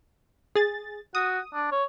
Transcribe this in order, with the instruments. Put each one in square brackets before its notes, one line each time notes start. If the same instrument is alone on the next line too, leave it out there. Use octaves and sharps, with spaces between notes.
[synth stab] G#4 A6
[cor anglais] F#4 [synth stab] D#6
[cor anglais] D4
C#5